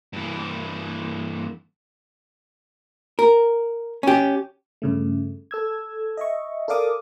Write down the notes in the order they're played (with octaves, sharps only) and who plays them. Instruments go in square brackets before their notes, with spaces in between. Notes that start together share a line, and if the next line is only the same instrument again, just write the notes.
[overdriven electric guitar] G2 E3
[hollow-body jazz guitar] A#4
C#4 G4
[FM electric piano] G2 C#3 A3
A4 E6 G#6
D#5 E5 C#6
A4 A#4 D5 F5 D6 D#6